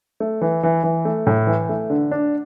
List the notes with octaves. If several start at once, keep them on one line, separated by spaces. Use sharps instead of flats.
A3
E3
E3
E3
A3
A2
E3
A3
D3
D4